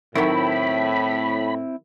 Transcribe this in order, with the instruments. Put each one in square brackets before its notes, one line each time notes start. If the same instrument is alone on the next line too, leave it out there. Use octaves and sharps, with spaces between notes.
[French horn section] A2 [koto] D#3 F#3 [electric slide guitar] C4 E4 [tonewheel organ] B5